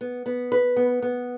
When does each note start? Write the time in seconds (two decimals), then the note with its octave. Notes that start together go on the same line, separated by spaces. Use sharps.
0.01 B3
0.26 B3
0.52 B4
0.77 B3
1.02 B3